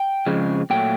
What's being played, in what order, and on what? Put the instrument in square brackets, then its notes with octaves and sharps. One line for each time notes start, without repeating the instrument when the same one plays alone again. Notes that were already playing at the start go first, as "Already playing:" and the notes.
Already playing: [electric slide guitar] G5
F2 C#3 F3 G#3
A#2 F#3 A3 G5